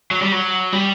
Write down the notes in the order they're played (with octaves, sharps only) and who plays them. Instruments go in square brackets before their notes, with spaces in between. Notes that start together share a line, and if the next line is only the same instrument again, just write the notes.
[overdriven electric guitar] F#3
G3
F#3
G3